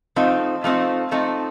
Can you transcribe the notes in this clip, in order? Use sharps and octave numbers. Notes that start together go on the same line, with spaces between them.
F3 A3 C4 D#4
F3 A3 C4 D#4
F3 A3 C4 D#4